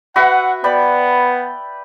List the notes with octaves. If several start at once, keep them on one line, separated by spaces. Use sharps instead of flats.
F#4 B4 E5 F#5
B3 D5 G5 B5